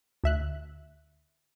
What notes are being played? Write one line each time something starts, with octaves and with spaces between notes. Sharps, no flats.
D2 E5 F#6